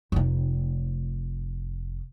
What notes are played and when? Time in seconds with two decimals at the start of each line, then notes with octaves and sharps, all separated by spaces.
0.12 F1 D#4